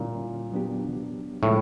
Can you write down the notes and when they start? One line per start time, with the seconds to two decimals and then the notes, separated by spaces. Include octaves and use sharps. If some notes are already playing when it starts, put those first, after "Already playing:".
Already playing: A#2 D3 G3 A#3 C#4 E4
0.52 F#3 B3 D4 G4
1.43 A2 C#3 F3 G#3